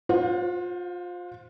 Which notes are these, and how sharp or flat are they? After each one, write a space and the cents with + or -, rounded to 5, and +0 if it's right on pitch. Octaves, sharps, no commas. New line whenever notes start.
F4 +25 C5 +0 F#5 -30